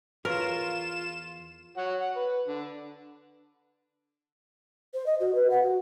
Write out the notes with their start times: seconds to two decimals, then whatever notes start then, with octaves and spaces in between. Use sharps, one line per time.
0.25 E2 F4 A#4 B4 C#5 E7
1.77 F#4 C#5 F#5
2.00 F#5
2.16 B4
2.47 D3
4.94 C5
5.06 D#5
5.20 F#4
5.34 B4
5.50 F#5
5.63 F#4